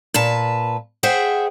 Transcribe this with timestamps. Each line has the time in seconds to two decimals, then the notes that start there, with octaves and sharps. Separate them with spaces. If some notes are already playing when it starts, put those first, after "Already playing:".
0.14 A#2 B4 A5
1.03 G#4 C5 E5 F#5 G5